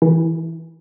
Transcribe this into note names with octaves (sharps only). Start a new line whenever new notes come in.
E3